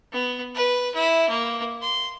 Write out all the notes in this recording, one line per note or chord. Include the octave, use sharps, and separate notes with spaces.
B3
B4
E4
A#3
C6